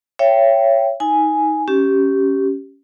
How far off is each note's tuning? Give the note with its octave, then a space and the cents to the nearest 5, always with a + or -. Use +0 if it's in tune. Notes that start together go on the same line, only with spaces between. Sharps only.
C#5 +0 E5 +35 G5 +0
D#4 +20 G#5 +0
C#4 +0 G4 -15